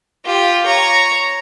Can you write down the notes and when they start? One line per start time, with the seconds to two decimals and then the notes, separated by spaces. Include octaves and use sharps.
0.25 F4 G4
0.66 C#5 A#5